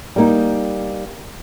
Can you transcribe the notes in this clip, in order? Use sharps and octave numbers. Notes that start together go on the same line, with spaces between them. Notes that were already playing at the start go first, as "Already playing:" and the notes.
G3 A#3 D#4